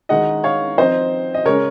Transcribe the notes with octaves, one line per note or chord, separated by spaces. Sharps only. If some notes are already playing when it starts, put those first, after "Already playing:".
D#3 G#3 D#4 D#5 F#5
C#5 F5
F3 C4 D#4 C5 D#5
D#5
C#3 G#3 C#4 A#4 C#5